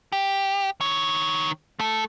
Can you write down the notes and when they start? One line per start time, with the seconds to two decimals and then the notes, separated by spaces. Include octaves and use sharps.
0.12 G4
0.81 D#3 C#5
1.80 A3 A4